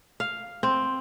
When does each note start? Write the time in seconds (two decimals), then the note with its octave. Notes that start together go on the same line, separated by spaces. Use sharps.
0.20 F5
0.63 C4